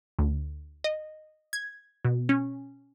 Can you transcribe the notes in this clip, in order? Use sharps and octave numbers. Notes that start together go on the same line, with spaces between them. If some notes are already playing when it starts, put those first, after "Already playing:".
D2
D#5
G#6
B2
C#4